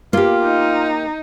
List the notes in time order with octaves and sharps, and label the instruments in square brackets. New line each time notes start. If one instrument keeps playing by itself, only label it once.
[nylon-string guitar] A#3 G4 [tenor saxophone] F4
[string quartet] D#4